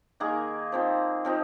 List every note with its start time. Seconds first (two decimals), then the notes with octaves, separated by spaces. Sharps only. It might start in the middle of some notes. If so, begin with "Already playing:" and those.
0.20 D#3 A#3 D#4 G#4
0.72 F3 C4 D#4
1.25 F3 C4 D#4